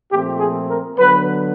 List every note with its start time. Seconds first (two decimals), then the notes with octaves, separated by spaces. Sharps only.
0.11 A#2 F3 A3 C4 G4
0.39 G#4
0.69 A#4
0.97 D3 F#3 B3 B4